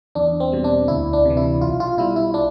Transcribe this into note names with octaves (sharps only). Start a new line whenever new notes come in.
E2 D4
C4
B2 G3
D4
D2 E4
D4
C3 E3
E4
B1 F4
F4
B2 G3 E4
E4
D4